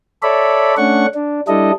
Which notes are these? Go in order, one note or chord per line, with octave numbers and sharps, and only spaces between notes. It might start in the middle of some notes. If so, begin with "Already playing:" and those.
A4 C#5 D5 E5 B5
A3 C#4 D4 F#5 C#6
D4
G3 D4 E4 A4 D#5